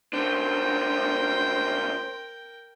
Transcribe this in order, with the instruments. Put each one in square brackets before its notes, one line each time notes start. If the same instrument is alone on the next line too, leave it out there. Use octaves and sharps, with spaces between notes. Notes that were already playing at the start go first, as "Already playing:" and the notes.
[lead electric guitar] C#2 D4 [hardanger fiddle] A#4 G5 [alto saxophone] C5